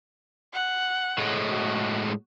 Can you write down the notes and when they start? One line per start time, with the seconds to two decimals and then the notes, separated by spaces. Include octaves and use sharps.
0.53 F#5
1.18 A2 G#3
1.49 F#4